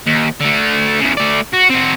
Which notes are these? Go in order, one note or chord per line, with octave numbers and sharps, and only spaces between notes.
D#2
D3 A3
E2 C#3
A3 D5
F#4
C4 F#4